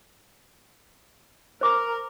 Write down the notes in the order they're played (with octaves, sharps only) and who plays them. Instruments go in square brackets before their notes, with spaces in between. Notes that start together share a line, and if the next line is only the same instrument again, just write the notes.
[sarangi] A#4 [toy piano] C5 D6